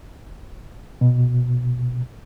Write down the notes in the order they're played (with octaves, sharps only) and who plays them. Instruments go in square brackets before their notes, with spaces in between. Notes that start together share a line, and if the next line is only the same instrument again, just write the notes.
[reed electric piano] B2